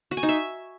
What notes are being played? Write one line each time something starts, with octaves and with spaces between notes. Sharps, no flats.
F#4
G#5
D#4
E5